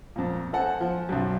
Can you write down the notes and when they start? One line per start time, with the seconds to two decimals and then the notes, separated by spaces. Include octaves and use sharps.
0.16 F2 A#2
0.53 A4 C5 F#5 G#5
0.81 F3
1.09 B1 F#2